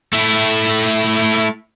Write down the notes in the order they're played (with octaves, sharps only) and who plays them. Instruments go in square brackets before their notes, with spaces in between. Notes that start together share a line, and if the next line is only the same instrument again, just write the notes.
[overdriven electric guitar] A3 E4